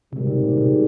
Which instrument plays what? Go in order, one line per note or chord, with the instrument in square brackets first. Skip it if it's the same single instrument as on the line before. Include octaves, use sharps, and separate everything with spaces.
[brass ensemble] G#1 G#2 D#3 G3 [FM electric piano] C3
[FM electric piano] C3
A#2
C3